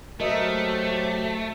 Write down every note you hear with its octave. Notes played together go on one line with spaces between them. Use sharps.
F#3 A3 F#4 G4 A#4 C5 D#5 E5